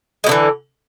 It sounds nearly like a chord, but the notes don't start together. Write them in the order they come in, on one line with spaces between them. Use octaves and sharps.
G#3 B2 D3 E3